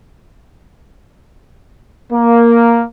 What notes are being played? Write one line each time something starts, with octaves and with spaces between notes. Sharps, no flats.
A#3